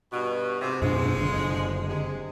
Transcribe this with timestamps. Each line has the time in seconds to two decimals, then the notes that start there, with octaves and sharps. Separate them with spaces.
0.12 G2 B2
0.61 G#2 C3
0.82 F#2 B2 F3 G#3 D4
1.17 F#1 D3
1.88 C3 G#3